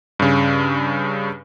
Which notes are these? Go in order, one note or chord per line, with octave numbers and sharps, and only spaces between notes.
G2 C#3